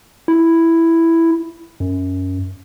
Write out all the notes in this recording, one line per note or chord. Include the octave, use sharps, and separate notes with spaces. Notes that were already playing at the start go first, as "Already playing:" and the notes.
E4
F#2